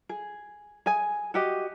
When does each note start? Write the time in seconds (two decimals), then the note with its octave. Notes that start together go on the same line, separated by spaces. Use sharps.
0.09 G#4
0.86 G#4 G#5
1.34 F#4 G4 D#5